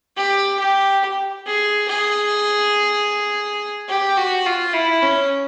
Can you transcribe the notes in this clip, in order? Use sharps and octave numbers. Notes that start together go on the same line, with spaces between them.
G4
G4
G#4
G#4
G4
F#4
F4
E4
C#4